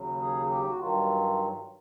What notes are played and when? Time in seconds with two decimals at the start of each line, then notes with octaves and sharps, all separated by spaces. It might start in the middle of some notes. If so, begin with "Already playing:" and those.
Already playing: D#2 C#3 F#3
0.21 G#4
0.50 G4
0.69 F#4
0.79 G2 D#3 F#3 F4